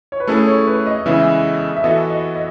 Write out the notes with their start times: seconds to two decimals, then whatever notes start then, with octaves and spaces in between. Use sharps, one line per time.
0.12 C#5
0.20 B4
0.27 A3 C#4 E4 G#4 A4
0.47 C#5
0.67 B4
0.87 D#5
1.06 C#3 E3 G#3 B3 E4 E5
1.76 E5
1.84 E3 B3 F#4 A4 D#5
2.10 D#5
2.35 D#5